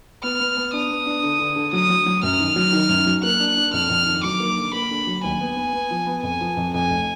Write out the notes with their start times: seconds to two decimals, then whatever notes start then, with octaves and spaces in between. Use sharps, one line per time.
0.23 B3 F6
0.40 B3
0.57 B3
0.73 D4 D#6
0.90 B3
1.06 D4
1.23 D3
1.39 D3
1.56 D3
1.73 F#3 D#6
1.90 F#3
2.06 F#3
2.23 F#2 F6
2.40 D#3
2.56 F#3
2.73 D#3
2.89 F#2
3.06 F#3
3.23 A#3 F#6
3.40 D4
3.57 D4
3.73 F2 F6
3.90 F2
4.06 D#3
4.24 F#3 D6
4.40 A#3
4.57 D3
4.73 A#3 B5
4.91 D3
5.07 F#3
5.24 D#2 G#5
5.40 B3
5.56 B3
5.73 B3
5.91 F3
6.07 B3
6.23 F2 G#5
6.41 F3
6.57 F2
6.74 F2 G#5
6.90 F1